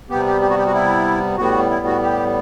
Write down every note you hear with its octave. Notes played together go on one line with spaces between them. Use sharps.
C3 G3 B3 G4
G4
G4
F#4
G4
F#4
E4
A2 G3 B3 F#4
E4
F#4
G4